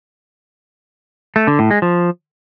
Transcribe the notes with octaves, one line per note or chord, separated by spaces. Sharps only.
A3
D3
A2
G#3
F3